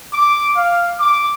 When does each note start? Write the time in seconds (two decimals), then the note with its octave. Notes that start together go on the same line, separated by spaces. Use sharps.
0.13 D6
0.56 F5
0.99 D6